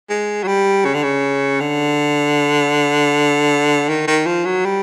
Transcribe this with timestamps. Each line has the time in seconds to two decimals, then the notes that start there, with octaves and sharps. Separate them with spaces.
0.09 G#3
0.43 F#3
0.47 G3
0.85 C#3
0.94 D3
1.03 C#3
1.60 D3
3.89 D#3
4.07 D#3
4.26 F3
4.45 F#3
4.65 G3